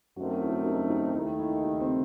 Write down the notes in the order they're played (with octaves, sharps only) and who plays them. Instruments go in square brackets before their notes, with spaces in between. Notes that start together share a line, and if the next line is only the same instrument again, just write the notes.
[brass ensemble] F#2 D#3 A3 C4 [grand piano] F#4
[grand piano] E4
D#4
D#4
[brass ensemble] D#2 D#3 A3 [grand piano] E4
[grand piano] E4
D#4
C4